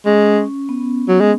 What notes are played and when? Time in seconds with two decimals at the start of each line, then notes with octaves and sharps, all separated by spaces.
0.06 G#3 C#4
0.69 B3
1.08 F#3
1.21 G#3